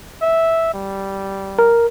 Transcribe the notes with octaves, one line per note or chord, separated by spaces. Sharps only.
E5
G3
A#4